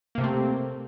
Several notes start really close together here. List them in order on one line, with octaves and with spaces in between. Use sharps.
A#3 C3 A3 C4